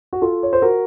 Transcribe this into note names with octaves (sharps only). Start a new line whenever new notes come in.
F#4
F4 A4
C#5
C5
F#4 A#4